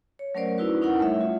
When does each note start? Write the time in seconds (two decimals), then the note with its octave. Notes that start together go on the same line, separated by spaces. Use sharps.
0.19 C#5
0.35 F#3 A3 C#4 A#4 C5 D5
0.58 C#4 D#4 E4 F#4 B4
0.82 C#4 D#4 E4 A#4 F#5
0.99 G3 A3 C#5 E5
1.21 F4